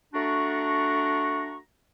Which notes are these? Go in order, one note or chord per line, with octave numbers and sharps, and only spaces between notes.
A3 D4 F#4 F#5 A#5 C#6